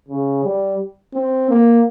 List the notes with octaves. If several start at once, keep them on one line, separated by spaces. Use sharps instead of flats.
C#3
G3
C4
A#3